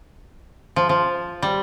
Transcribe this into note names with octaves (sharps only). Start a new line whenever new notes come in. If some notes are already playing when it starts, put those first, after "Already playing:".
F3
F3
G3